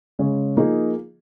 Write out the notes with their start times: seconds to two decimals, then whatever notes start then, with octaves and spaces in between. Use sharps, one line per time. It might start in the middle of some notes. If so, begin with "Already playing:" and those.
0.19 C#3 G#3 C#4 G#4
0.57 F3 A#3 D#4 G#4